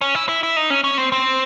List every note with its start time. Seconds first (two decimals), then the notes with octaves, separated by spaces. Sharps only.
0.01 C#4
0.15 E4
0.29 E4
0.43 E4
0.57 D#4
0.70 C#4
0.84 C#4
0.98 C4
1.12 C4